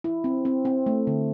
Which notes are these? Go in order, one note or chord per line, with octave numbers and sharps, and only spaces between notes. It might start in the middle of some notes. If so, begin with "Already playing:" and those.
E4
C4
C4
C4
A3
D3